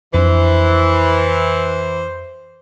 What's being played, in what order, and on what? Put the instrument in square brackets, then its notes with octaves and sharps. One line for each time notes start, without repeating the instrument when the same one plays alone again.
[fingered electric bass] F2 D4 [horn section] E3 [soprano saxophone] C5